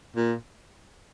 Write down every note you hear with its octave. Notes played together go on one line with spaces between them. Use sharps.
A#2